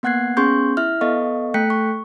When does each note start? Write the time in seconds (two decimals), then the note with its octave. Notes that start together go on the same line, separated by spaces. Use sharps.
0.03 A#3 B3 F#5 F#6 G#6 C7
0.37 B3 C#4 G#4 C6 C#6 G6
0.77 E4 E5 F6
1.01 B3 A4 D#5 F5 C#6
1.54 A3 A4 G5 F#6 B6 C#7
1.70 C#6